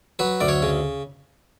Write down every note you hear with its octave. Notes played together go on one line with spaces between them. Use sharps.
F#3 B4
D2 D5
C#5
C#3